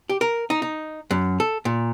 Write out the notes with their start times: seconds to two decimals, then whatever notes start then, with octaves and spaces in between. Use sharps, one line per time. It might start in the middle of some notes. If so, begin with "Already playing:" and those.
0.09 G4
0.21 A#4
0.50 D#4
0.62 D#4
1.11 F#2
1.40 A4
1.65 A#2